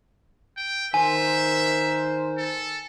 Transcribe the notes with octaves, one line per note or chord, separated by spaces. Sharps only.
G5
D#3 A#4 C5 E5 G#5
A4